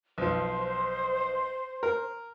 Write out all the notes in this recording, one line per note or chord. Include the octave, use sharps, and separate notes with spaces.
B1 F3 C5
A#4